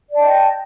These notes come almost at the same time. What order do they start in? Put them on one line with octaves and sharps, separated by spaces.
D5 A5 G5 D#5